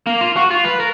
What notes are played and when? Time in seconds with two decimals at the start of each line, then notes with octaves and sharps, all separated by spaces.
0.07 A#3
0.21 F4
0.36 F#4
0.51 F4
0.64 B4
0.80 A#4